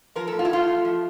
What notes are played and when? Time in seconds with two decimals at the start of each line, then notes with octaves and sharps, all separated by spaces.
0.16 F3 A#4
0.27 A2 A4
0.39 F4
0.45 E4
0.50 A2 F4
0.68 A3
0.84 F3